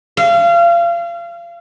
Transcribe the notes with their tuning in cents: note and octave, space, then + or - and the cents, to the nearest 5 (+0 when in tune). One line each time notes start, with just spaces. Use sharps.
F5 -30